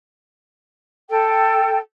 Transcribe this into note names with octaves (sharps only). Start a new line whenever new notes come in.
A4 G5